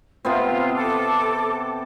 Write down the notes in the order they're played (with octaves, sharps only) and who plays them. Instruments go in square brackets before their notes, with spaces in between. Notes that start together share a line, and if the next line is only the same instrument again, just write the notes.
[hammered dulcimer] C3 B3 C4 [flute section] F4
[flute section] A4 D6